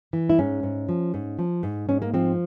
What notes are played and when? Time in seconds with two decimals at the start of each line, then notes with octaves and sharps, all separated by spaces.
0.13 E3
0.30 E4
0.39 G#2 C#4
0.63 G#2
0.89 F3
1.14 G#2
1.39 F3
1.63 G#2
1.89 G#2 C#4
2.02 A#3
2.14 F3 C4